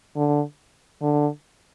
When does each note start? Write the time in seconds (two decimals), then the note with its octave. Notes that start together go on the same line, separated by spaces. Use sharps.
0.16 D3
1.02 D3